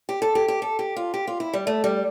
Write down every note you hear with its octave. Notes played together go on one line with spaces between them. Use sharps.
G4
A4
G4
G4
A4
G4
F4
G4
F4
E4
G3
A3
G3